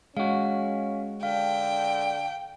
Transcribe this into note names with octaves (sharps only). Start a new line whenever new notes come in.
G#3 C#4 F#4 F5
D3 F5 G5